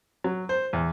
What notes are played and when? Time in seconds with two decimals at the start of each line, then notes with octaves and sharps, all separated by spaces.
0.24 F#3
0.49 C5
0.73 E2